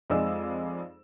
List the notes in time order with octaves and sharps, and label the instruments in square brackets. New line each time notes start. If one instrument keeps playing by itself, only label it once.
[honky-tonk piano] F2 G#3 D#4 G#4 D5 E6